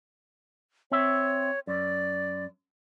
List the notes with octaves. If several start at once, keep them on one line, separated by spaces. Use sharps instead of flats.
C4 C#5 E5
F#2 D5